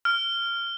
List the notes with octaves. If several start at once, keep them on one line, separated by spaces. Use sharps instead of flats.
F6